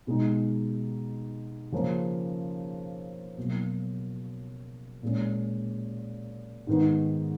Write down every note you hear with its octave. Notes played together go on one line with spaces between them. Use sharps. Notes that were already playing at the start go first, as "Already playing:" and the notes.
B2 G#3 D#4
C#3 F3 A#3 C#4
B2 F#3 A#3
A#2 G#3 C#4
G#2 D#3 G#3 B3 D#4